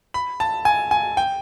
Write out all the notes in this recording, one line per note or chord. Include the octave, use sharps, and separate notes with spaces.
B5
A5
G#5
G#5
G5